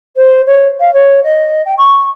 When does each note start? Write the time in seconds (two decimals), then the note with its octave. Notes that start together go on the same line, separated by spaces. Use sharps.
0.16 C5
0.46 C#5
0.79 F5
0.93 C#5
1.23 D#5
1.65 G5
1.78 C#6